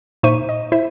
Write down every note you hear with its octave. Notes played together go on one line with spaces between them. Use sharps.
A#2 D#4 C5 E5 C#6 D#7
D#5
E4 C5 E5